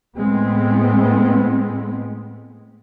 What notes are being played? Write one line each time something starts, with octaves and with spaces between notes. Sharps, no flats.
A2 G#3 B3 C4